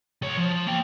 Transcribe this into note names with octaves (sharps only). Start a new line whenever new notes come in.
C#2 C#5
F3
A#3 G5